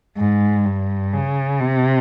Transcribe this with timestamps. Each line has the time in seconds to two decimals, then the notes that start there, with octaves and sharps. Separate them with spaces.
0.17 G#2
0.66 G2
1.13 C#3
1.60 C3